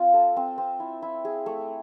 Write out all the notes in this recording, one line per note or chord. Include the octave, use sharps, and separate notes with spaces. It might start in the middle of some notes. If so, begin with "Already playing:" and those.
Already playing: C4 F4
A4
C4
C4
E4
E4
G#4
A3